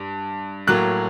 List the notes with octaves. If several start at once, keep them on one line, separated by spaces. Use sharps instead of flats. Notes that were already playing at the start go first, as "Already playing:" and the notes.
Already playing: G2
A2 F#3 A#3 F#6